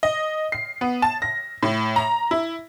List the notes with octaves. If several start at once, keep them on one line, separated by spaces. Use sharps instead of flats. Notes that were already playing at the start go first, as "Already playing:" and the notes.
D#5
C7
B3
A5
A#6
A2
A#5
E4